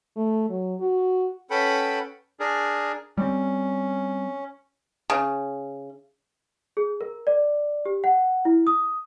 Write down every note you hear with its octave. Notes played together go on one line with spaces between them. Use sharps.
A3
F#3
F#4
C#4 A4 B4 F#5 G5 B5
D4 G#4 A#4
G3 A3 C4 C#4
C#3
G#4
A#4
D5
G4
F#5
E4
D#6